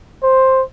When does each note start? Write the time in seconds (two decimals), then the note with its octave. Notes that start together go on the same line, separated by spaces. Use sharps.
0.23 C5